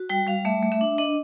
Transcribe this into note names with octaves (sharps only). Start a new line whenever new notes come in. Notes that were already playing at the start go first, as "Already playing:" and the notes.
Already playing: F#4
G3 G5
G3 F5
A3 E5
A3
E5
D4
D4 D#5